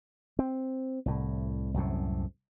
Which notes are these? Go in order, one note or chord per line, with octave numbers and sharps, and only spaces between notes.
C4
C2 A2
C2 F#2 A2 C3